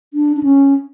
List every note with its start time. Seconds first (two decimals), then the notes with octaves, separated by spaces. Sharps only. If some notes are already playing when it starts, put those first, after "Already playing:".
0.14 D4
0.37 D4
0.43 C#4